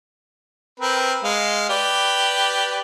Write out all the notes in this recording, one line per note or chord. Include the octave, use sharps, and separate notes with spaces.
C4 A#4 B4
G#3 F5
G4 B4 D5